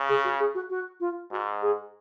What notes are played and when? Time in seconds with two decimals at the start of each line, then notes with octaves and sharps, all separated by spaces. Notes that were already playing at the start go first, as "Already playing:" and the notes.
Already playing: C#3
0.09 G#4
0.24 F#4
0.40 G#4
0.55 F#4
0.70 F#4
1.00 F4
1.32 G#2 F#4
1.62 G#4